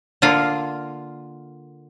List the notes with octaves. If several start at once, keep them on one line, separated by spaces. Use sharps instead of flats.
D3 A#3 F4